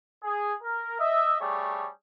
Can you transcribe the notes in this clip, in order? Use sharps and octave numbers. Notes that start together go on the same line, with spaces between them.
G#4
A#4
D#5 E5
G3 A3 D4 G#4 C#5